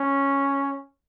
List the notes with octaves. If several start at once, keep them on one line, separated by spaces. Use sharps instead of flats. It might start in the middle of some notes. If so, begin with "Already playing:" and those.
Already playing: C#4